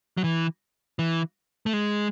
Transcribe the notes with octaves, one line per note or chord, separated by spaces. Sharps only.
F#3
E3
E3
A3
G#3